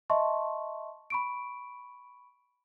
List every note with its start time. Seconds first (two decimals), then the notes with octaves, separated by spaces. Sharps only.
0.10 D#5 E5 A5 C6 C#6
1.10 B5 C#6 D7